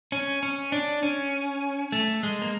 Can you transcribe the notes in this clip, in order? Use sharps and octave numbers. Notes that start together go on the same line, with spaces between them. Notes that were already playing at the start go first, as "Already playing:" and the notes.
C#4
C#4
D4
C#4
A3
G#3
A#3